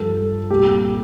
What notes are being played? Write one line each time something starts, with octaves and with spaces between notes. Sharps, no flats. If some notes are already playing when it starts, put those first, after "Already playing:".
Already playing: G2 F3 A4
C2 A#2 G3 G4